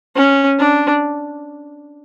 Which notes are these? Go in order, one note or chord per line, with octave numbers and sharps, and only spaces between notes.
C#4
D4